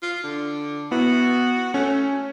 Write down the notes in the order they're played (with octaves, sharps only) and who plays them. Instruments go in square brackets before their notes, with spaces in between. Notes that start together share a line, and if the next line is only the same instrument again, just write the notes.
[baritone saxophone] F4
D3
[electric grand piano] B3 E4 [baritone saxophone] F#4
[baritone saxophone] A3 [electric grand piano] C#4